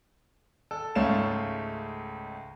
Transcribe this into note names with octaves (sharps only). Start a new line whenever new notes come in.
A4
C#2 G#2 A3 C#5 F5 E7